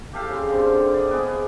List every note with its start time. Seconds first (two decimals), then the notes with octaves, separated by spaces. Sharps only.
0.13 G4 A4 F5 G5
0.30 C#3 C6
0.49 D3 C4
0.94 D5 D#5
1.11 B3 G#4